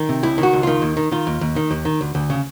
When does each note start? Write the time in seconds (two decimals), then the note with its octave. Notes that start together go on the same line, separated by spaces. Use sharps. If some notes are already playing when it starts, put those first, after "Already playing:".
Already playing: D#3
0.09 C3
0.23 C#2 E4
0.38 D#3
0.43 F#4
0.53 C#2
0.63 D#3 F4
0.82 D#2
0.97 D#3
1.12 D#3 F4
1.27 D#2
1.41 D#2
1.56 D#3
1.71 D#2
1.85 D#3
2.01 D2
2.15 D2
2.30 C#3